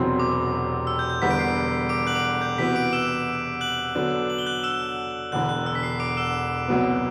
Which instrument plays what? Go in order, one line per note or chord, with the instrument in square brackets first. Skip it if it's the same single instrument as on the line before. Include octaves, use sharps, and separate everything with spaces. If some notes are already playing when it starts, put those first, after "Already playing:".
Already playing: [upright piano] E1 E2 C3 F#3 C4
[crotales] D6
E6
G6
G6
[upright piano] E1 E2 D3 G3 B3 [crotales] B6
[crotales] D7
C7
D6 D7
F#6 F#7
D6 D7
G6
[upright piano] C3 E3 B3 F#4 [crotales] B6
[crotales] D6 D7
E6 E7
F#6 F#7
[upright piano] D3 F#3 B3 D4 A4
[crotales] F#7
G7
F#6 F#7
E6 E7
[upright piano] E1 E2 D3 [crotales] F#6
[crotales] F#6
E6
B6
C7
D6 D7
E6 E7
[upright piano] C2 B2 F#3 B3